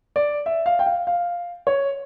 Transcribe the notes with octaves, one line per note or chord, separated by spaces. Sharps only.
D5
E5
F5
G5
F5
F5
C#5